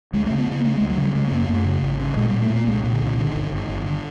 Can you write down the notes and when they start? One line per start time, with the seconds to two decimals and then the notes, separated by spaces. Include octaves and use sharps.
0.13 D2 G#3
0.26 A3
0.30 C#3
0.38 B3
0.47 C#3 A#3
0.64 C#3 A3
0.76 G#3
0.81 D2
0.90 F#3
0.97 C#3
1.03 G3
1.15 C#3 G#3
1.28 A#3
1.31 F#2
1.40 A#3
1.49 F#2 A3
1.65 C#3
1.82 G#1
1.99 C#3
2.17 A#2 G#3
2.29 G3
2.33 A#2
2.42 A3
2.50 A#2
2.55 A#3
2.67 C2 G#3
2.84 A#2
2.93 D3
3.01 C2 D#3
3.13 E3
3.18 D3 D#3
3.35 G1
3.52 G1
3.68 G1
3.86 D3